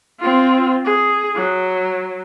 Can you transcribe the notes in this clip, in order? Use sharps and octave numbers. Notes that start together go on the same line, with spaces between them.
C4 F4
G#4
F#3